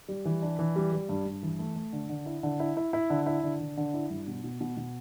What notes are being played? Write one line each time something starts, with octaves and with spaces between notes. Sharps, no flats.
G3
E3
D4
E3
G3
G3
G2
G2
E3
A3
A3
D3
D3
E4
D3
E4
E4
E4
D3
E4
D3
D3
D3
E4
G2
B2
B2
B2
B2